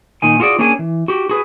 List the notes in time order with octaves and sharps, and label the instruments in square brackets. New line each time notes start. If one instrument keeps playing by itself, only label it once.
[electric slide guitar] A#2 D#3 G#5
F4 F#4 G#4 D5
A#3 C#4 D4 G#4 D5 G#5
E3
F#4 G4
F#4 G#4 B4